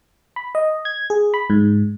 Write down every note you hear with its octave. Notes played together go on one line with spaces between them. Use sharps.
B5
D#5
G#6
G#4
B5
G#2